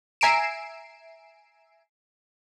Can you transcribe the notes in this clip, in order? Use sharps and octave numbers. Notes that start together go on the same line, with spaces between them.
E5 G#5 A#5 C7 D7 E7